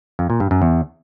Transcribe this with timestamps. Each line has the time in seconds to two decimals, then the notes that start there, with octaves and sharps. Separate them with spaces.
0.19 F2
0.30 A#2
0.40 G2
0.51 F#2
0.62 E2